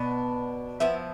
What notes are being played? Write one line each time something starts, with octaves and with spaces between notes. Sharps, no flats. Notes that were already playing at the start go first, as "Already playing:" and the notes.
Already playing: B2 B3 D4
F3 B3 E4 E5